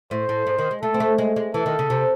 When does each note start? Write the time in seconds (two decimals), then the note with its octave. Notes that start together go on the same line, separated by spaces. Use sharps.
0.11 A2 C5
0.29 A2
0.47 G#2
0.59 D#3
0.71 G#3
0.82 A3 A4
0.94 C4
1.00 A3
1.18 G#3
1.36 G#3
1.54 E3 A4
1.66 D#3
1.79 C#3
1.90 C3